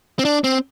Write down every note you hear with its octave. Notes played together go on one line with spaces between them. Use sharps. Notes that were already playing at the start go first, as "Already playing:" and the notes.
C4
D4
C4